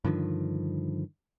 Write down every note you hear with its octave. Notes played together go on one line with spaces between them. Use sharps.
G2 D3 D#3 F3